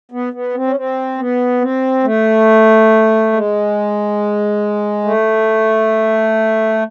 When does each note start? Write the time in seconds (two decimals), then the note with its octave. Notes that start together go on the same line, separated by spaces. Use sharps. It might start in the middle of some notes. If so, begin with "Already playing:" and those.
0.11 B3
0.33 B3
0.55 C4
0.67 C#4
0.76 C4
1.18 B3
1.61 C4
2.04 A3
3.33 G#3
5.04 A3